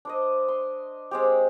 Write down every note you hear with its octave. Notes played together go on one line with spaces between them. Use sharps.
D4 C5 D#5
C6
G#3 C4 G4